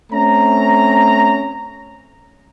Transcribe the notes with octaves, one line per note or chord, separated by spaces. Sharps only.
A3 C4 C#4 A#5